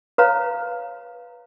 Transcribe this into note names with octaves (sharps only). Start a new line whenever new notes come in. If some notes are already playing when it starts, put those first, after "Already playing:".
B4 C#5 F5 A#5